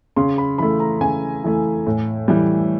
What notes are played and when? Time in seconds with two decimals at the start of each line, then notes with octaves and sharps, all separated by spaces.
0.16 C#3 C6
0.38 B5
0.58 E3 A3 B5
0.80 A#5
1.01 C#3 G#5
1.44 E3 A3
1.87 A2
2.28 E3 G3